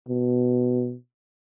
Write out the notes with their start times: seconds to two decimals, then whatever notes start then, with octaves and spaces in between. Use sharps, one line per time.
0.09 B2